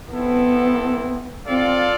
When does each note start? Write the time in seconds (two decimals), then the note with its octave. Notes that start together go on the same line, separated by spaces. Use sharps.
0.12 B3 C4 E4 A4
1.47 C4 F4 A4 D5 F5